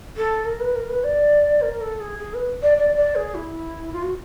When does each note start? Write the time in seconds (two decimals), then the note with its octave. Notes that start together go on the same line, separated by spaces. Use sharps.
0.17 A4
0.45 A#4
0.60 B4
0.75 A#4
0.89 B4
1.04 D5
1.61 A#4
1.81 A4
2.00 G#4
2.19 G#4
2.34 B4
2.62 D5
2.77 D5
2.96 D5
3.15 G#4
3.35 E4
3.93 F4
4.02 F#4